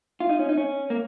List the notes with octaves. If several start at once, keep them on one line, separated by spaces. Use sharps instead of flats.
F4
D#4
C#4
D#4
C#4
A#3